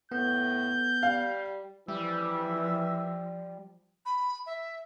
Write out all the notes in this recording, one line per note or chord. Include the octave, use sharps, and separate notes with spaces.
A2 B3 G6
G3 F5
E3 F3 G3 E5
B5
E5